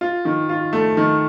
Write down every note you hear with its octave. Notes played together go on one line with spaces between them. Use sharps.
F4
D#3
F4
A3
D#3